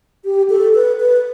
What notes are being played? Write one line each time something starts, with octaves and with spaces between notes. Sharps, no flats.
G4
A4
B4
B4